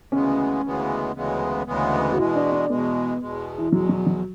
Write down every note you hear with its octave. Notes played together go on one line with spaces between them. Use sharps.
D2 C#3 E3 G#3 B3 C#4
D2 C#3 E3 G#3 B3
D2 C#3 E3 G#3 B3
D2 C#3 E3 G#3 B3
F#4
E2 B2 G#3 E4
D4
D4
E2 B2 G#3 B3
E2 B2 G#3
E3
E2 B2 F#3 G#3
F#3
F#3